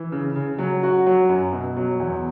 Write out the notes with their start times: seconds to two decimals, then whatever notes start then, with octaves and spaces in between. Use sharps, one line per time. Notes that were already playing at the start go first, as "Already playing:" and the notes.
Already playing: E3
0.12 C#3
0.36 C#3
0.59 F#3
0.83 F#4
1.07 F#3
1.29 F#2
1.53 B2
1.77 F#3
2.00 E2